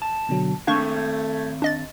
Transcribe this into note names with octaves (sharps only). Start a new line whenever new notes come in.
A5
B2 D3 F#3
D#3 A3 A#3 C4 D4 C#6 G6 G#6
D4 D#5 A6